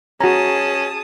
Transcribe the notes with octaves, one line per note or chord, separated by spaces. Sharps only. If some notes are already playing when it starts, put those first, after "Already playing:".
C#4 F#4 G#4 A5 A#5 D#6